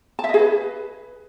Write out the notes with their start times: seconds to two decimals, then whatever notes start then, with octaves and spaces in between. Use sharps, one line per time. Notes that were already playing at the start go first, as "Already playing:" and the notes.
0.19 A5
0.24 E5
0.29 D#5
0.34 G#4
0.39 B4